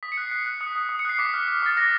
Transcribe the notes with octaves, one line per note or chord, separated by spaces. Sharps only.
D#6 B6
C#7
F#6 C7
F#6 C7
F#6
D#6 C#7
D#6
D#6
C#7
F#6 C7
D6 B6
F6
F6
D6 A6
F6 A#6